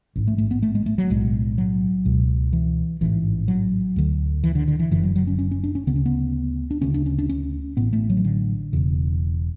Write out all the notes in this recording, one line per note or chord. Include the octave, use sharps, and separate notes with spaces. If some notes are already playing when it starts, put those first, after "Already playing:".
A1 G#2
A3
A3
B3
A3
G#3
A3
F#3
B1 A2 G#3
F#3
C#2 B2
E3
A1 G#2 E3
F#3
D2 D3
E3
D3
D3
E3
F#1 F#2 D3 E3
F#3
F#3
C#4
C#4
C#4
D4
C#4
D2 C#3 B3
C#4
B3
D4
D2 C#3 C#4
D4
C#4
D4
C#4
A1 A2 B3
A3
F#3
E3
D3
E1 E2 C#3